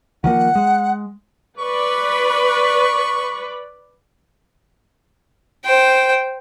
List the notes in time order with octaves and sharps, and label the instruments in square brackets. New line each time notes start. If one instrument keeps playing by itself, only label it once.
[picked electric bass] D#3 F3 A#3 [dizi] F#5
[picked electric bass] G#3
[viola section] B4 D5 B5 [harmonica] C#6
[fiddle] C5 G5